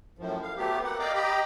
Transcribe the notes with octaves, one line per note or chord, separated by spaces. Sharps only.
F#2 A2 F3
F5
F#3 A3 B3 G4
A#3 C4 F#5
D5 D#5 F5 G5 A#5 D6
G4 D#5 G5 A#5 B5